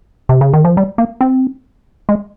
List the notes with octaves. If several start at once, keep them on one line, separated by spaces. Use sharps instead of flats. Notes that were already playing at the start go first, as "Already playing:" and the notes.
C3
C#3
D#3
F3
G3
A#3
C4
G#3